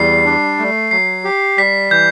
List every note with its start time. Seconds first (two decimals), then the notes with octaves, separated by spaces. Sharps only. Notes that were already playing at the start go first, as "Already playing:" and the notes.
Already playing: E2 G3 C7
0.25 D4
0.59 A3
0.91 F#3 C7
1.24 G4
1.58 G3 B6
1.91 E3 G6